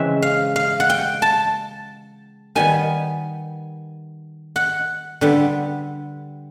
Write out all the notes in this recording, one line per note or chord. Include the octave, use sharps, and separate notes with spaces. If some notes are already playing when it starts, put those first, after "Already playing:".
Already playing: C#3 E3 G#3 C4 E5
F5
F5
F#5
G5
A5
D#3 G3 B3 G#5
F#5
D3 G3 B3